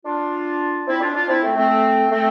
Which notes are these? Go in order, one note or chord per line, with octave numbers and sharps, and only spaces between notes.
D4 F4
C4 E4
D4 F4
D4 F4
C4 E4
A3 C4
A3 C4
A3 C4